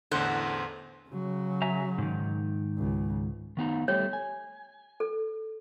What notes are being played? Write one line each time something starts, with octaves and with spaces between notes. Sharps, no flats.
A1 E2 D3 C5 F#5
C#3 F#3
E5 G#5 A#5
G#2 D#3
C#2
D#3 B3 D#4
G3 A3 G4 C#5
G#5
A4